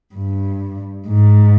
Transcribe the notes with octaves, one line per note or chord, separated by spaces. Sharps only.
G2
G#2